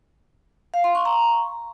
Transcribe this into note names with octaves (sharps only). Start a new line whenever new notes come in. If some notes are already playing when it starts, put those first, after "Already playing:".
F5
C6
C#6
A#5